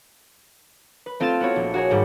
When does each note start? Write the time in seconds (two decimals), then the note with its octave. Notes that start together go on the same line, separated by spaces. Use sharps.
1.06 B4
1.20 A3 C4 F4 F6 A6 E7
1.40 B3 E4 F#4 C#5
1.56 A#1
1.74 F#4 G#4 A#4 C#5
1.90 G#1 G#2 G3